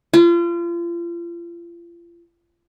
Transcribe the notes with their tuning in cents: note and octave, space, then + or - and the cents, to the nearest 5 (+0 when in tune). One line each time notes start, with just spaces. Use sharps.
F4 -35